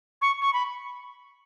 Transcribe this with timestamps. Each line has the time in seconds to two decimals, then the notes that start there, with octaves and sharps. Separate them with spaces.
0.22 C#6
0.42 C#6
0.53 B5